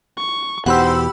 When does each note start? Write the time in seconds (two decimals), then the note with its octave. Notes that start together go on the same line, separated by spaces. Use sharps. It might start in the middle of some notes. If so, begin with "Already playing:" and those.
0.17 C#6
0.66 E2 B2 D#4 G4 C5 F#5 B5 E6